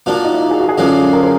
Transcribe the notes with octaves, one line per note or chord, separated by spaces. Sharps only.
A#2 F3 A#3 D4 F#4
D#4
E4
D#4
G#4
F#4
G#4
F#2 D3 F3 A#3 D4
A#4
C5